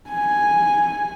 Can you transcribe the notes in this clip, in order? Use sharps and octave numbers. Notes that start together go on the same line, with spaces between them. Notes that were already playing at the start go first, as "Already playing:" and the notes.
G#5